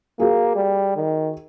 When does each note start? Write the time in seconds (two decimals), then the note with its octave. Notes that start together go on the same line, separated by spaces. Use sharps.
0.19 A#3 F#4 G#4
0.56 G3
0.97 D#3